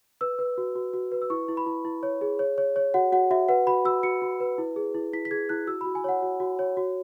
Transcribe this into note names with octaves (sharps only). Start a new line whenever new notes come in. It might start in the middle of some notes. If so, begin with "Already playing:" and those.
B4 E6
B4
F#4
F#4
F#4
B4
E6
E4 C#6
E4
B5
E4
E4
C#5
G#4
C#5
C#5
C#5
F#4 F#5
F#4 F#5
F#4 E5
B4 F#5
F#4 B5
F#4 E6
F#4 C#7
F#4
B4
E4
G#4
E4
E4 B6
B6
G#4 G#6
E4 F#6
F#4 E6
B5
F#4
G#5
C#5 F#5
F#4
F#4
C#5
F#4